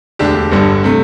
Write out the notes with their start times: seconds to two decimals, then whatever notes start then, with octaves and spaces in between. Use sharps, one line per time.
0.19 E1 D2 D3 D4 G4
0.52 G1 G2 D3 G3
0.84 C3 A3